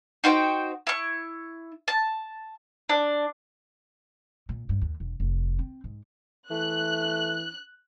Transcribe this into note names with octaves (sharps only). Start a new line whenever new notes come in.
D#4 F#4 C5 G5
E4 C#6
A5
D4
A#2
G2
D#2
E1
F1
C4
G#2
E3 A3 F#6